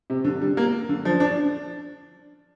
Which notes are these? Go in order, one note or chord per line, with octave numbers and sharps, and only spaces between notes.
C3
D3
G3
A#3
D3
F3
D4